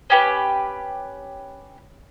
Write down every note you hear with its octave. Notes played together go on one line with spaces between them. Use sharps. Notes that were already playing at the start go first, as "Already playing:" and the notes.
C#4 G4 B4